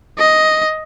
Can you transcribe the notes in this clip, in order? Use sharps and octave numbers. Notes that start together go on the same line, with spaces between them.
D#5